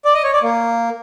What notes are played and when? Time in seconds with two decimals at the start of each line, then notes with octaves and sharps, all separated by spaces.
0.05 D5
0.14 D#5
0.24 C#5
0.33 D5
0.43 A#3